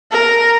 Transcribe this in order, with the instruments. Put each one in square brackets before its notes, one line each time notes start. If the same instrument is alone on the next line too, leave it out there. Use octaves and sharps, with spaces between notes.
[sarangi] A#4